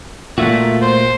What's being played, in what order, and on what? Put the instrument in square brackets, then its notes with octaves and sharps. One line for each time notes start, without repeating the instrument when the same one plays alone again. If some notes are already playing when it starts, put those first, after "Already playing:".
[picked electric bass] A#2 [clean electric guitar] A3 F4 F#4 [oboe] E5
[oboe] C5